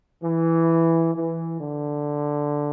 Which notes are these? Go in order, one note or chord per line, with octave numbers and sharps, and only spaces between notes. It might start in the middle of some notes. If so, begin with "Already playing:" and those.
E3
E3
D3